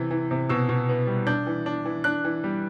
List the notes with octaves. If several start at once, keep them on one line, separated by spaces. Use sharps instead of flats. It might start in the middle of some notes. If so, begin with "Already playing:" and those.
Already playing: C3 E3
E3
C3
B2 E6
B2
B3
G3
D4 G6
E3
D4
E3
D4 F#6
E3
G3